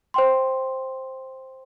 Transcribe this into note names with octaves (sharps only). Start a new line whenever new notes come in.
C5 G5 C6